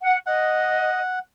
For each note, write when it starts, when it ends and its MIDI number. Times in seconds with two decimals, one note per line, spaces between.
0.01 0.18 78
0.26 1.00 75
0.26 1.19 78